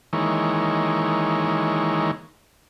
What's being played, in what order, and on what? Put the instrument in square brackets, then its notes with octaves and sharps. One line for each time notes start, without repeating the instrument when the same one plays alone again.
[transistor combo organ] D#3 E3 G#3 A#3 C#5